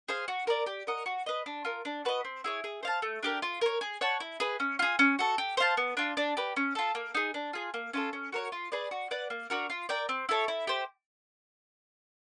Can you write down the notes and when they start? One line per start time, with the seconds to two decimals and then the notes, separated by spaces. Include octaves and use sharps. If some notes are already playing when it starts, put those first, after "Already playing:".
0.08 G#4 C5 F5
0.28 F#4
0.47 A#4 D5
0.66 G4
0.87 A#4 D#5 F#5
1.06 F#4
1.26 B4 D#5
1.46 D4
1.65 F4 A#4
1.85 D4
2.05 F#4 B4 D#5
2.25 C4
2.44 E4 G#4 C#5
2.64 G#4
2.83 C5 F5 A5
3.02 A3
3.23 D4 G4 A#4
3.42 F4
3.61 A#4 C#5
3.81 G#4
4.01 C#5 F#5 A5
4.20 E4
4.40 G#4 B4
4.60 C#4
4.79 F4 G#4
4.99 C#4
5.19 F#4 A4
5.38 G4
5.57 C5 F5 A5
5.77 B3
5.97 D4 F4
6.17 D4
6.37 G4 B4
6.56 C#4
6.75 F4 A4
6.95 A#3
7.15 D#4 G#4
7.34 D4
7.53 F4 G#4
7.74 A#3
7.94 C#4 F4 A4
8.13 C#4
8.32 F#4 A#4 C#5
8.52 F4
8.72 G#4 B4 D5
8.91 F#4
9.11 B4 D5 F#5
9.30 A#3
9.50 D4 F#4 A#4
9.70 F4
9.89 A#4 D5 G5
10.09 C4
10.29 E4 A4 C#5
10.48 E4
10.67 G4 C5